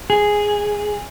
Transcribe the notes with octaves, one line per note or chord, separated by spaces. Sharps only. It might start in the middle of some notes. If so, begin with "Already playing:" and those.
G#4